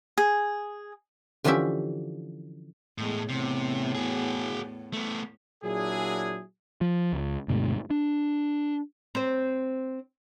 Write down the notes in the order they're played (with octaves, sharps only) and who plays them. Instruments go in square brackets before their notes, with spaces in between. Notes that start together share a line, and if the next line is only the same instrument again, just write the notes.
[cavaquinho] G#4
[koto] D3 E3 F3 C#4 G4 E5
[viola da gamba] E2 G#3 [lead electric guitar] A2
[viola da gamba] E2 A2 B3 [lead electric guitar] C3
[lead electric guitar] F#4 G#4
A3 B3
[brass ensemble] A#2 F#3 D4 E4 G#4
[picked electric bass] F3
C#2
D2 G2 B2 G#3
D4
[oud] C4 C5